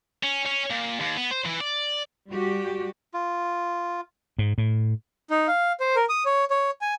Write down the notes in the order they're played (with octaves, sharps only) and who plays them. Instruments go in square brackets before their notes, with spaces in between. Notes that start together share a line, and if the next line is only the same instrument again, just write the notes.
[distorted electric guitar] C#4
C#4
A#2
D#2
B3
C5
E3
D5
[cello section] G3 F#4 G4
[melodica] F4
[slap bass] G#2
A2
[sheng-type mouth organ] D#4
F5
C5
A#4
D#6
C#5
C#5
G#5